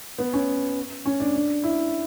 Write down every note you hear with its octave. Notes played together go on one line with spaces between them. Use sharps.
B3
C#4
C#4
D4
D4
E4